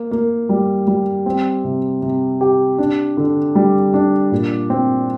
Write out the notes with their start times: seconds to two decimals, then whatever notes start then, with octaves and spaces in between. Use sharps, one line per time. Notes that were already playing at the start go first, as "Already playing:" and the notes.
Already playing: A#3
0.11 A#3
0.49 G3
0.87 G3
1.26 C4
1.64 C3
2.02 C3
2.41 G4
2.79 D4
3.17 D3
3.55 G3
3.94 D4
4.32 A#2
4.70 C4